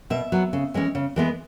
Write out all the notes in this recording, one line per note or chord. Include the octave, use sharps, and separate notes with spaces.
B2 E5
F#3 B3
C#3
E3 G#3 C#4
C#3
E3 G#3 B3